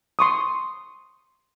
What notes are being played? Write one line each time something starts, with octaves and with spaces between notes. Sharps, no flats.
C6 C#6 D#6